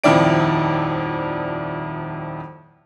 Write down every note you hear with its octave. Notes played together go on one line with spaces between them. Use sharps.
D#1 F2 D#3 E4 D5 D7